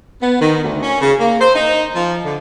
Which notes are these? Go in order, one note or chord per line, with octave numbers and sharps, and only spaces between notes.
B3
D#3
D2
C#4
C#3
A#3
C5
D#4
F3
D3